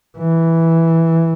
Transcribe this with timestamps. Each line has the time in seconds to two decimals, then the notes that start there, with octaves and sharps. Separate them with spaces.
0.18 E3